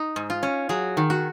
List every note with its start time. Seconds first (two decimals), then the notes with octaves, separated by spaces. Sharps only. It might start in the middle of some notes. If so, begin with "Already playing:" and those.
Already playing: D#4
0.16 G#2
0.30 F4
0.43 C#4
0.69 F#3 G#4
0.97 D#3
1.10 F#4